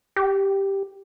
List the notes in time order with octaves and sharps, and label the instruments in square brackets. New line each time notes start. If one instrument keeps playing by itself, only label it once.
[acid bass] G4